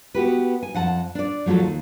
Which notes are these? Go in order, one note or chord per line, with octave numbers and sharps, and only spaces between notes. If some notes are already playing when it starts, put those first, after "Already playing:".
B3 F#4 G4 B4
G#5
F2 F#5 A5
D4 D5
F3 F#3 A3 F#4 A4
D#2